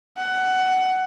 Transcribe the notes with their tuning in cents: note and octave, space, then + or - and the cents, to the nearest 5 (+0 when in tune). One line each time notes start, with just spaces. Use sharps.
F#5 +15